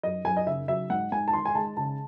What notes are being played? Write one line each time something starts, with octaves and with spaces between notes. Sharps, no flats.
F#2 D#5
F#2 G#5
D#5
C#3 E5
F#3 E5
G#2 F#5
G#2 G#5
A5
D#3 C6
G#5
G#3 A5
C#3 A5